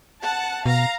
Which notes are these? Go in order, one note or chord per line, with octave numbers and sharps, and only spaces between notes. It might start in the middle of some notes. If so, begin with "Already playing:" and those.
F#5 A5
B2 F5 A#5